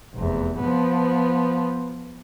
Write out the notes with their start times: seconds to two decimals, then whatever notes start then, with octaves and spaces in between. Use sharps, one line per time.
0.15 F1 E2
0.60 F3 B3